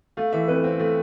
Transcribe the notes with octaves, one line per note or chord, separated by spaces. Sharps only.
A3 F5
E3 E5
F2 B4
C4
A3